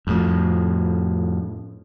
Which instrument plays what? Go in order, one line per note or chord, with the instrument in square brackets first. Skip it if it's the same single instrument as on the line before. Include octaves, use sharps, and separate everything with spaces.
[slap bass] F2 A2